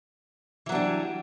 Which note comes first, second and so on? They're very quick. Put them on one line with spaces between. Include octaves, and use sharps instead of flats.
E3 F#3 D4 G3